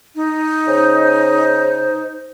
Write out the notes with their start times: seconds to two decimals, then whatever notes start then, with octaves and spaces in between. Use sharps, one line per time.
0.15 D#4
0.67 C#3 C5